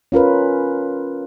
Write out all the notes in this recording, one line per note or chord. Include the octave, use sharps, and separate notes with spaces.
C#4 F4 A#4 B4